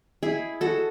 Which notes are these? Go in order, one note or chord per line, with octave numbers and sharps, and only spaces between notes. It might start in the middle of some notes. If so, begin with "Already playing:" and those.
E4 G#4
F#4 A4